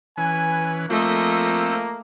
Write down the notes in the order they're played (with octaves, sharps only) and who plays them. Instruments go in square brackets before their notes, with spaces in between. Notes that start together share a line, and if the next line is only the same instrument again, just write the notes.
[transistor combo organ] E3 C#4 B4 [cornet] G#5
[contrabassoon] F3 [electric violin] A3 D#5 [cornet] A#3 [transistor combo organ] C4 E6